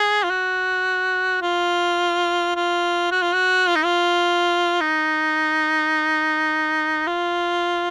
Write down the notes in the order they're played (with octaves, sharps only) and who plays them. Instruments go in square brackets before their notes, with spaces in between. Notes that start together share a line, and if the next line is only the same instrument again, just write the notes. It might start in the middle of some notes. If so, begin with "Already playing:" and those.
Already playing: [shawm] G#4
F4
F#4
F4
F4
F#4
F4
F#4
F4
D#4
F4
D#4
F4